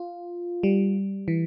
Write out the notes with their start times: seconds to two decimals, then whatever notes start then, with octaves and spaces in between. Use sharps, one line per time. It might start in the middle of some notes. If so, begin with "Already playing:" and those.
Already playing: F4
0.63 G3
1.28 E3